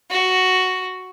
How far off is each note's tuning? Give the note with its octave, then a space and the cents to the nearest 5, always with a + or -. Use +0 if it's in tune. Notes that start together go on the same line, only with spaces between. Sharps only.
F#4 +0